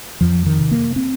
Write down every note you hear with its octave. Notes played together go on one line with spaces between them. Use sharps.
F2 F3
D#3
C3
A#3
C4